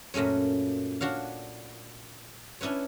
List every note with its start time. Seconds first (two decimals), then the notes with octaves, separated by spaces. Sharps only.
0.14 F#2 A#2 A3 C#4 C#5
1.01 D4 F#4 C#5 F5
2.61 C#4 D4 E4 B4 C#5